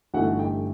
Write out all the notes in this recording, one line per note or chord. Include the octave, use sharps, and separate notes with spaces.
G1 G2 E3 A3 D#4 F#4 F#5
G4 G5